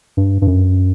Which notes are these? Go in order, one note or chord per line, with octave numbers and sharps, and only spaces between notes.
G2
G2
F#2